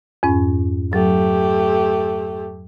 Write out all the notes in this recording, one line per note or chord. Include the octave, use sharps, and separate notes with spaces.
F2 G#2 C#4
F#3 A3 G4